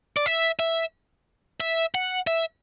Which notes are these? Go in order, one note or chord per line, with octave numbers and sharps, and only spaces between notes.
D5
E5
E5
E5
F#5
E5